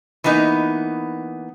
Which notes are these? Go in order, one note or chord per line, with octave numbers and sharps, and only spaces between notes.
E3 A#3 B3 D#4